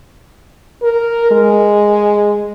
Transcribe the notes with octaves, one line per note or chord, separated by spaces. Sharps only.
A#4
G#3